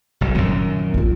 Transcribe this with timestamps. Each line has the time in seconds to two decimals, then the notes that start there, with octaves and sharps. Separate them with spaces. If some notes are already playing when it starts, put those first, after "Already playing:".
0.21 F#1 C2
0.35 F#2 A#2 D#3 C4
0.94 A#1 F4